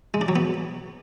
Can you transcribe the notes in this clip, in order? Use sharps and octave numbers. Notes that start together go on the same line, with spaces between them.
G#3
D4
F#3
B3